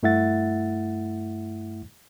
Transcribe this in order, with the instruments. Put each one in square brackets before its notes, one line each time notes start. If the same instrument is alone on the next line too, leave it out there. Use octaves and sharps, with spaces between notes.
[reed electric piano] G2 A3 E4 E5 F#5 A6